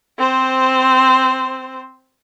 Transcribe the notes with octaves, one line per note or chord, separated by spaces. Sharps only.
C4 C5